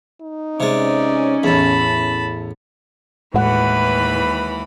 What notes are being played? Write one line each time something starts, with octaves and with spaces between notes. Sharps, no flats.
D#4
C3 G#3 C#4 D5
A1 E2 A5 B5
D#2 A2 E3 G#3 B4 F#5 B5